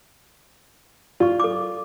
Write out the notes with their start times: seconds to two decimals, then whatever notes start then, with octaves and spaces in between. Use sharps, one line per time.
1.20 F4 D5 C#6
1.40 A4 D6